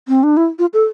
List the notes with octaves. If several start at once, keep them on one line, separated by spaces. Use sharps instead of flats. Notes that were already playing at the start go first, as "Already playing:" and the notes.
C4
D4
E4
F4
A4